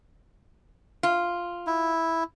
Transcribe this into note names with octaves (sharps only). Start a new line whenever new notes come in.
F4
E4